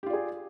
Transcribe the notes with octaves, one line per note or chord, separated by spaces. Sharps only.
F4 G4 G#4 D5